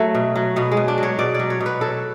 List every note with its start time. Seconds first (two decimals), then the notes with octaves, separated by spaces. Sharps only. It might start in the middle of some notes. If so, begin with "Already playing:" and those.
Already playing: F#3 A3
0.15 B2
0.36 F#3
0.56 B2 B3
0.72 G#3
0.77 B2
0.88 D4
0.98 F#3
1.03 C#5
1.19 B2 D5
1.34 F#3 D5
1.50 C#5
1.60 B2
1.66 B4
1.81 F#3 A4